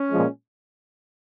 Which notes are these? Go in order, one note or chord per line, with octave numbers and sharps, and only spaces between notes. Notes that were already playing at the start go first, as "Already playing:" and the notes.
Already playing: C#4
A#2 F3 G#3